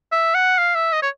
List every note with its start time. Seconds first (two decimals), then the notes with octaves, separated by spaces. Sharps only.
0.12 E5
0.35 F#5
0.58 F5
0.75 E5
0.92 D#5
1.02 C#5